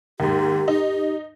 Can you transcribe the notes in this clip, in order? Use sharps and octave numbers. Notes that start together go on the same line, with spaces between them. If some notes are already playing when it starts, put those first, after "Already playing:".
D#2 G#2 G4
D#4